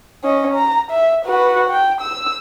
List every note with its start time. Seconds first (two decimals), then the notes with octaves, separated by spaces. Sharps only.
0.24 C#4 D#5
0.54 A#5
0.91 E5
1.26 F#4 B4
1.70 G5
2.01 E6